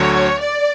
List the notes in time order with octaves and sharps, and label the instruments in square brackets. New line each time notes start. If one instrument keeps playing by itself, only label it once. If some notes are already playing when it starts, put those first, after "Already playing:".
Already playing: [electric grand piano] D2 D3 F#3 [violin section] C#5
[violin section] D5